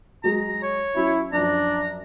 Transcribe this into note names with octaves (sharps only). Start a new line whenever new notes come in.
F#3 G#3 G#4 A#5
C#5
F#3 C#4 E4
F#2 F3 D4 A#5